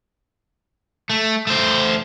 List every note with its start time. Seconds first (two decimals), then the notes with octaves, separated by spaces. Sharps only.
1.10 A3
1.47 A3 C5